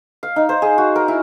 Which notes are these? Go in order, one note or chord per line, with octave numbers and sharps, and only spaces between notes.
F5
D#4
C5
G#4
F#4
A#4
E4